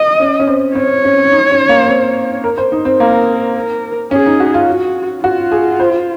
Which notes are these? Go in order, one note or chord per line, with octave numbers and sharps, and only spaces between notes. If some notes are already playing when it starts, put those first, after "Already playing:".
Already playing: D#5
C#4
C#4
C4
C4 C#5
C#4
D#4
C#4
A#3
C4
A#4
C5
D#4
C4
A#3 A#4
A#4
C#4 G#4
D#4
F#4
F4
F#4
F4 F#4
G#4
C5